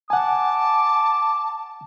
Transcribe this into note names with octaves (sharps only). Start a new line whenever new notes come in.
F#5 G#5 A5 D6